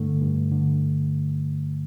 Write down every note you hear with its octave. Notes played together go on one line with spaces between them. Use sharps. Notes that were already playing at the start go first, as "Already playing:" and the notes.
Already playing: G2 D3 A3
G2
D3